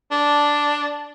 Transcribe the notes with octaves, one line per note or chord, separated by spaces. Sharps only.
D4